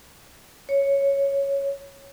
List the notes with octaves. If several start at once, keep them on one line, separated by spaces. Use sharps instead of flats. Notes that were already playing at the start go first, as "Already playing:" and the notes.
C#5